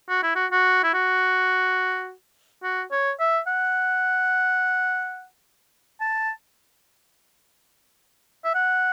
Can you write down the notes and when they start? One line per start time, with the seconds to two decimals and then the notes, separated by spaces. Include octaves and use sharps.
0.09 F#4
0.23 E4
0.35 F#4
0.52 F#4
0.84 E4
0.94 F#4
2.63 F#4
2.91 C#5
3.20 E5
3.47 F#5
6.01 A5
8.44 E5
8.55 F#5